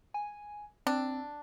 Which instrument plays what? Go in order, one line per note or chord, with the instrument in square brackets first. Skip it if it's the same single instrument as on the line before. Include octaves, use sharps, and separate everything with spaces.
[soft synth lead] G#5
[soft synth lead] C4 [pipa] D4